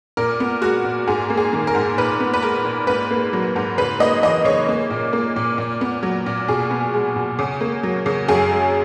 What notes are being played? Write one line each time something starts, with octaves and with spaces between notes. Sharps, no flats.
A#2 A#4
B3
G#3 F#4
A#2
G#2 G#4
A#3
G#4
D#3
A#4
G#2
A#2 B4
B3
B4
G#3 A#4
A#2
G#2 B4
A#3
F#3
G#2
C#3 B4
A#3 D#5
E3 D#5
C#3 C#5
A#3
A#2
A#3
A#2
A#2
B3
F#3
A#2
B2 G#4
B3
G#3
B2
C#3
A#3
F#3
C#3
F#2 G#4
G#3